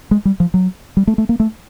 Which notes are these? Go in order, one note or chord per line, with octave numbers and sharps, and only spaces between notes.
G#3
G3
F3
F#3
G3
A3
A3
A#3
A3